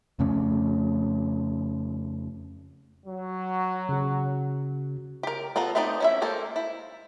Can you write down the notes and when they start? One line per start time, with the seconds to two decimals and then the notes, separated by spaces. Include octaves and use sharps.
0.19 F2 C#3 A3 C#4
3.06 F#3
3.89 C#3 F#4
5.23 G4 A#4
5.56 B3 F4 A4 A#5
5.75 A3 B3 C4 D#4 D5
6.00 C#4 E4 E5
6.22 G#3 A#3 A4 C5
6.56 E4